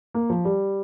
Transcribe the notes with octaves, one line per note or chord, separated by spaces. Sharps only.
A#3
F3
G3